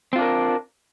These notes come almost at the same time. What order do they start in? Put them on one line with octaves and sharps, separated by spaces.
C4 F4 D4 A#4